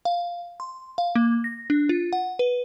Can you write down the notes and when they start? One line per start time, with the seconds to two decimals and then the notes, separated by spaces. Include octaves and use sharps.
0.05 F5
0.60 C6
0.98 F5
1.15 A#3
1.44 A#6
1.70 D4
1.89 F4
2.13 F#5
2.39 B4